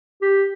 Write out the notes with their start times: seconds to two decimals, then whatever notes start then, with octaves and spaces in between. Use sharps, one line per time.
0.22 G4